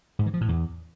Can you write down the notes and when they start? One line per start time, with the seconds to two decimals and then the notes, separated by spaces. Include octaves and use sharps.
0.19 G#2
0.26 E3
0.34 F3
0.41 A2
0.48 E2